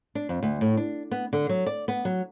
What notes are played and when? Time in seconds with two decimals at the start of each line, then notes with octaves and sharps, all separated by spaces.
0.15 D4
0.29 F2
0.43 D2
0.61 A2
0.77 D4
1.11 B3
1.33 D3
1.49 F#3
1.66 D5
1.88 B3
2.05 F#3